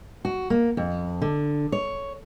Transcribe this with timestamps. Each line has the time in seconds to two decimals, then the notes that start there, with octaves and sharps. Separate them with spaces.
0.25 F#4
0.50 A#3
0.77 F2
1.21 D3
1.72 C#5